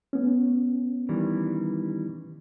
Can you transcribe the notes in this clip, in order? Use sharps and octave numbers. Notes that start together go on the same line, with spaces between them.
A3 B3 C#4
D#3 E3 G3